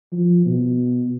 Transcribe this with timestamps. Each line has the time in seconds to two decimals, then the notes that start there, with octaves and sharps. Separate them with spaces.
0.12 F3
0.46 B2